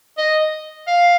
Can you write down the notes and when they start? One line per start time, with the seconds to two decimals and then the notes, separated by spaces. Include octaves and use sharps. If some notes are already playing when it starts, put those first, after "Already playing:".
0.18 D#5
0.87 F5